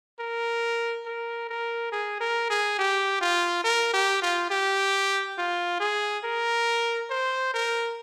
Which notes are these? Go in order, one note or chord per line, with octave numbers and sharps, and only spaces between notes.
A#4
A#4
A#4
G#4
A#4
G#4
G4
F4
A#4
G4
F4
G4
F4
G#4
A#4
C5
A#4